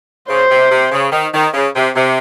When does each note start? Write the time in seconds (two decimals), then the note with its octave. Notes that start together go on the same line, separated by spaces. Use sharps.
0.29 C#3 C5
0.51 C3
0.71 C3
0.92 C#3
1.12 D#3
1.34 D#3
1.54 C#3
1.75 C3
1.95 C3